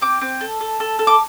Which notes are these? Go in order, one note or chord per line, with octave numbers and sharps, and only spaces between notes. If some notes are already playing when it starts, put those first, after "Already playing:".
C4 D6
C4
A4
A4
A4
A4
D6